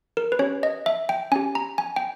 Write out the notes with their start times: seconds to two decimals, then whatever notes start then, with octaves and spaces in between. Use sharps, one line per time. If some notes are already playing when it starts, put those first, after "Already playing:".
0.17 A#4
0.32 B4
0.39 C#4 G4 C#5
0.63 D#5
0.86 E5
1.09 G5
1.32 C#4 G4 G#5
1.55 A#5
1.78 G#5
1.96 G5